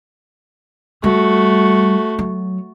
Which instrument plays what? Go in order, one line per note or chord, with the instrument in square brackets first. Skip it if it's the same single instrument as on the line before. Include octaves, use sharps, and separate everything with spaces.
[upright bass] G3 [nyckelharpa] A3 F#4
[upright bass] F#3